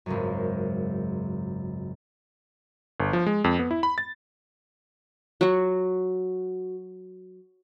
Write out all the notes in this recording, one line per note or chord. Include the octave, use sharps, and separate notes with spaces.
G#1 C#2 F#2
G1
F3
G#3
F2
B3
E4
B5
A6
F#3 F#4